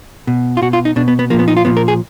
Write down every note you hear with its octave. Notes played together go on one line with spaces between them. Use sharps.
B2
F4
B2 F#4
F4
D#4
B2 D4
B3
B3
A#2 F3 A#3
B3
D#4
F4
A#2 F3 B3
A#4
G#4